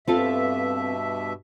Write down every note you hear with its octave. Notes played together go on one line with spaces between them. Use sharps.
G2 B2 C4 F4 A4 E5